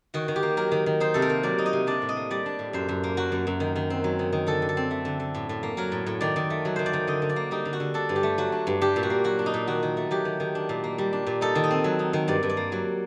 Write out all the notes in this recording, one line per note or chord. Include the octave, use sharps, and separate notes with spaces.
D#3 F#4
D#3
G4
A#3
F#3 A#4
D#3
D#3
D#4 C5
C3 A4
A#4
A#3
F#3 D5
D#4
D#5
C3
D4 D5
A2
D#5
A#3
G3 D5
D4
A2
F#2 C5
F#2
A#3
F#3 F#4
F#2
F#2
D#3
D#3
C4
F#3
D#3
D#3
D3 A4
D3
A4
C4
A3
D3
D3
A2
A2
A#3
F#3 A#4
A2
A2
D#3 D5
D#3
A3
F#3
D#3 C5
D5
D#3
D3 D#5
D3
D5
A#3
G3 D#4
D3
F#4
D3
D4 A4
G2
G4
A3
F#3 F#4
D4
G2
D4 G4
A#2
F#4
A#3
F#3 F#4
D4
D#4
A#2
D#3 F#4
D#3
A3
F#3 G4
D#3
D#3
D4
A#2
A#3
G3
D4
A#2
D#4 A4
D#3
D#5
C4
F#3
D#4
D#3
G2 D5
G2
D5
A#3
F#3